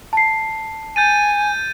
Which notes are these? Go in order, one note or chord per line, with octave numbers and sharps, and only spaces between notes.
A5 C7
G#5 G6 A6 D#7